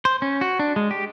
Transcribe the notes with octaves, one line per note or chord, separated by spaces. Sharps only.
C5
C#4
F#4
D4
G#3
G4